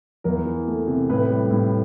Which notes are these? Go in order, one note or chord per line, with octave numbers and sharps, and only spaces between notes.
E2 A#4
E3
A3
C3
A2 B4
G3
A2